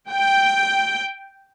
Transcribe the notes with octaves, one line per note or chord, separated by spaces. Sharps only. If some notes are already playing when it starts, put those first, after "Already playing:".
G5